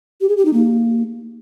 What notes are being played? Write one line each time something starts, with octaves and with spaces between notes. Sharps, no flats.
G4
G#4
G4
D#4
A#3